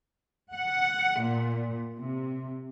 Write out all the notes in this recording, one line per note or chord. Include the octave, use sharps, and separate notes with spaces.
F#5
A#2
C3